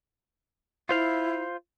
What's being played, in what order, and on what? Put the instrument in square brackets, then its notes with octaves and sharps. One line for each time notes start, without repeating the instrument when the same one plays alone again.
[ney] E4 [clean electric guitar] F4 C5 F5